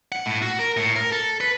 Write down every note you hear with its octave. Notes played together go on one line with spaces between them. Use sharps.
F#5
A2
F#4
A#4
A2
A#4
A4
B4